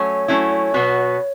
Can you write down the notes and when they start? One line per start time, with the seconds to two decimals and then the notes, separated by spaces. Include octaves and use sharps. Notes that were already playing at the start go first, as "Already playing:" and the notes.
Already playing: F#3 A3 C#4 C#5
0.28 F#3 A3 C#4 E4
0.74 B2 F#3 B3 F#4